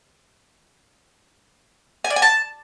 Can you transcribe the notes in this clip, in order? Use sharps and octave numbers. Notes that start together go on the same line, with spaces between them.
G#5
D5
G#5
A5